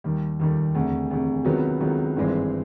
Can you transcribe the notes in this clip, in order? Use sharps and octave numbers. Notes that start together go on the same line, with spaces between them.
D#2 D#3 G3
D#2 D#3 G3
E1 D2 C3
E1 D2 C3
C#2 C3 D#3 F#3 B3
C#2 C3 D#3 F#3 B3
G#1 G2 E3 G#3 C4